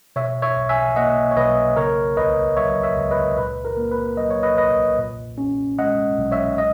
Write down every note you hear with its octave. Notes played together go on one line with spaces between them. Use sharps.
B2 C#5 E5
C#5 E5
B1
E5 G#5
A#3 D#5 F#5
C#5
B1 B4 D#5
C#3 A#4 C#5
C#2 B4 D#5
F#3 C#5 E5
C#5 E5
C#2
B4 D#5
A#2 B4
A#4
A#3
B4
F#3 D#5
C#5
B4 D#5
B1 B4 D#5
A#2
C#4
G#3 D#5 F#5
B1
C#5 E5
D#5